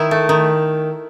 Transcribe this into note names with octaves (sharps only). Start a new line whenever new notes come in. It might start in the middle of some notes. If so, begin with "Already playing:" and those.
Already playing: D#3 E4
A3
D#3